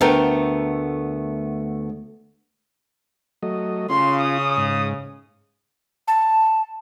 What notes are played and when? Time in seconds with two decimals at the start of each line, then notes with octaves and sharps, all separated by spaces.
0.01 D2 A3 B3 A4 A#4 G5
3.43 F#3 A3 D#5
3.90 C#3 C#4 F4 C6
4.21 D#6
4.57 G#2
6.08 A5